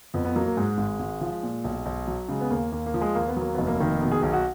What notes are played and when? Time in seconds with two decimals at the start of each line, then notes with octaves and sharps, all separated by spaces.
0.14 F2 B3
0.25 B3
0.35 F#3 A#3
0.46 A#3
0.57 G#2 G#3
0.78 G#1
1.00 G#1
1.21 F3
1.43 A#2
1.64 B1
1.86 B1
2.08 F#3
2.28 C#3 G#3
2.41 B3
2.50 D#2 A#3
2.72 D#2 A#3
2.86 A#3
2.94 F3
3.01 G#3
3.15 D#2 A#3
3.28 B3
3.37 F#3 A#3
3.54 F1 B3
3.67 A#3
3.80 D#3
4.01 B2 A#3
4.12 G#4
4.23 B1 G#4
4.33 F#4